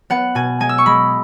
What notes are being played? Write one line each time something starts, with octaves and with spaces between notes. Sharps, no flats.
B3 F#5
B2 G#5
G#3 G#5
E6
C#6
G#3 B5